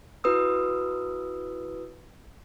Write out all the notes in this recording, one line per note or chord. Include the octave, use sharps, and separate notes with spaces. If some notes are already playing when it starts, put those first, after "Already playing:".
E4 F#4 B4 D#6 E6